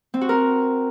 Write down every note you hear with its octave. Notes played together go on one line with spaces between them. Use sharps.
C4
F#4
A#4